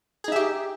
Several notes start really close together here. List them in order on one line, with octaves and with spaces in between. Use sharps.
G#4 D#4 E5 G4